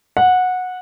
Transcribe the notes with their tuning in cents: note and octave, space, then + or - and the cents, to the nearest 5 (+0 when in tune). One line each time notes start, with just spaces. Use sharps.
F#5 -15